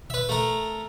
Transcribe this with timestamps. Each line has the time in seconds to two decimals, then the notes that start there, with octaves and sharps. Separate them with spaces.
0.10 B4 E5
0.29 A3 A#4